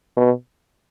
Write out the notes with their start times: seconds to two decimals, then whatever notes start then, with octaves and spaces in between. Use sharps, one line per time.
0.17 B2